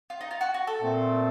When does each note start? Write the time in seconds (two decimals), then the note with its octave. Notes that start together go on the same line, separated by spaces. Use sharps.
0.10 F4
0.21 D#4
0.31 F4
0.41 F#4
0.54 F#4
0.67 A4
0.81 A#2 A3 C4